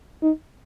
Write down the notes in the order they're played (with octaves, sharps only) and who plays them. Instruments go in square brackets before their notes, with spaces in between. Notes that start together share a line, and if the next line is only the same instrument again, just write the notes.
[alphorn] D#4